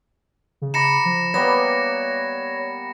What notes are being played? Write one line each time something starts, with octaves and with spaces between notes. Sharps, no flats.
C#3
A#5 B5 D6 A#6 C#7 E7
F3
G3 A#3 B3 C#5 A#6